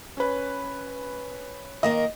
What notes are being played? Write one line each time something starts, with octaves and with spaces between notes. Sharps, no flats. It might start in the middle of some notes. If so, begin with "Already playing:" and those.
C#4 B4
D#3 A#3 A#4 D#5